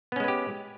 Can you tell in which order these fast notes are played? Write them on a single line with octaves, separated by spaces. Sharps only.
B3 C#4 G#3 B4 G4